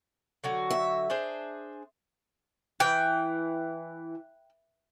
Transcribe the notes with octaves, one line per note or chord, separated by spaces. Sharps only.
D3 F#3 F#4
E5
D4 G#4 C5
E3 G5